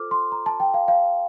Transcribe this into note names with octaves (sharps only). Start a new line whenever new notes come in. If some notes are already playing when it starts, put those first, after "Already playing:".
Already playing: F4 A4 C5 D6 F6
C6
A#5
A5
G5
F5
F5